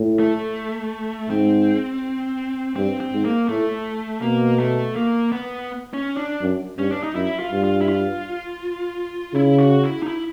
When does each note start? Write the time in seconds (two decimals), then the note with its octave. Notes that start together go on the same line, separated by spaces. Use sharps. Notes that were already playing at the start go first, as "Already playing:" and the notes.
Already playing: A2
0.20 A3
1.30 G#2 C4
2.76 G2 C4
3.00 C4
3.13 G#2
3.25 A#3
3.49 A2 A3
4.22 B2 A#3
4.59 A3
4.96 A#3
5.32 B3
5.94 C#4
6.17 D4
6.42 F#2
6.78 G2 C#4
6.92 D4
7.03 D#4
7.15 F#2 E4
7.39 F4
7.52 G2
7.64 F4
7.81 E4
7.89 F4
9.34 C#3 E4
9.58 F#4
9.83 E4
10.03 D#4
10.08 E4